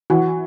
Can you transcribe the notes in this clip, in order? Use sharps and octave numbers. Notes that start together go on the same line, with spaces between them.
E3 F#4